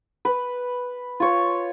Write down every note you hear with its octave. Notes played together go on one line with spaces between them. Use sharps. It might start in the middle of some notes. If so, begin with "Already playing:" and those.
B4
F4 C#5